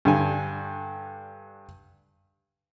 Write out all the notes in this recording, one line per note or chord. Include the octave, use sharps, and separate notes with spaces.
G2 D3 G#5